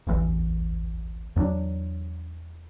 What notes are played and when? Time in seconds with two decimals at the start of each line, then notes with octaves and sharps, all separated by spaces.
0.07 D1 A1 E2 E3
1.36 E2 G2 F#3 D4